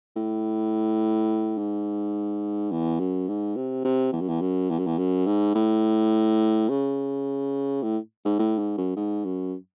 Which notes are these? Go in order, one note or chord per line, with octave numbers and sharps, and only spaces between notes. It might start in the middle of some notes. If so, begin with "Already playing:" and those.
A2
G#2
E2
F#2
G#2
C3
C3
E2
F#2
E2
F#2
E2
F#2
E2
F#2
G#2
A2
C#3
A2
G#2
A2
G#2
F#2
G#2
F#2